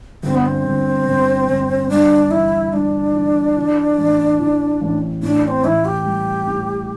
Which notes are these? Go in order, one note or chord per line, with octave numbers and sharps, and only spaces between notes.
G1 C4
B3
C4
G1
G1
G1
G2 D4
E3 E4
G2 D4
E3
E3
A1
E3
A1
A2 D4
D4
C4
A1 E4
G4
G3
A2